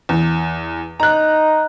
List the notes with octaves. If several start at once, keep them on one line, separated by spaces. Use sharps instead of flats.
E2
D#4 A#5 F#6